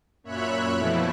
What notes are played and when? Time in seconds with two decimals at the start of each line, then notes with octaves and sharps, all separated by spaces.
0.23 F#2 A#2 C#5 E5 B5 F#6
0.75 B2 E3 F3 A3 E4